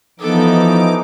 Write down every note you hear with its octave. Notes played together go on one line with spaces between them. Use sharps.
E3 F3 B3 D#4 A4 D6